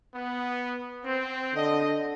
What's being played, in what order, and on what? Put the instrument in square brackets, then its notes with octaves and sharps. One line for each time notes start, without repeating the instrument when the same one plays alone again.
[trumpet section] B3
C4
[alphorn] D3 [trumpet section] D#5